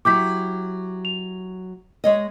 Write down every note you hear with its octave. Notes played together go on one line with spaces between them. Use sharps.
F#3 E4 G4 D6 G6 B6
F7
G#3 C#5 D#5